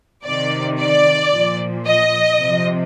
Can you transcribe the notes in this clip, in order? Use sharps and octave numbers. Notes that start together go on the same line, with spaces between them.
C3 D#3 D5
D5
A#2 F3
D#5
C3 F3